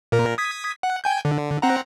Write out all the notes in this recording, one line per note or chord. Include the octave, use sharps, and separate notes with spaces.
A#2 A#4
D#6 G#6 B6
F#5
G5 G#5 G6
D3
C4 F#5 A#5